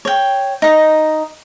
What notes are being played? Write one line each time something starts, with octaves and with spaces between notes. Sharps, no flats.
C#5 G5
D#4 D#5